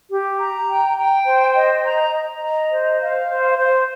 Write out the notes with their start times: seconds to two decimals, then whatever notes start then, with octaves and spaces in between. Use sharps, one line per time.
0.10 G4
0.39 A#5
0.68 G5
0.97 G5
1.25 C5
1.55 D#5
1.84 A#5
2.13 A#5
2.42 D#5
2.71 C5
3.00 F5
3.29 C5
3.58 C5